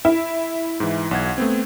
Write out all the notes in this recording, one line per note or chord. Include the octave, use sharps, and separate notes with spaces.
E4
G#2 E3
B1 F#5 G#6
A3 B3 C4